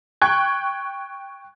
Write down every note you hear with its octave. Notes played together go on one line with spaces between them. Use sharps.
G5 C#6 F#6 G#6